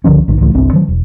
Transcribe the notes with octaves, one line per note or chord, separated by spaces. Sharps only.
C#2 D3 F3 C#4
A#1 G#2 D#3
C#2 A2 E3
G1 C2 C4 D4
D#3 F#3
E1